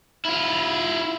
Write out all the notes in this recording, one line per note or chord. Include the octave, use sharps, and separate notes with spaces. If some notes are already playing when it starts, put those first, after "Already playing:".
E4 F4